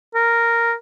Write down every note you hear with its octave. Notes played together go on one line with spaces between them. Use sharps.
A#4